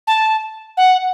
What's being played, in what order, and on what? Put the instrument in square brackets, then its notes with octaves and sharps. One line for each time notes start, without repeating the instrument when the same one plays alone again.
[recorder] A5
F#5